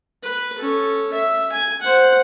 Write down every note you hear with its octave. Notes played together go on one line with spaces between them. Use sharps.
B4
C#4 A4
E5
G#5
C5 F#5